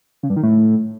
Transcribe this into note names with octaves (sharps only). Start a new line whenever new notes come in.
C#3
G2
D#3
A2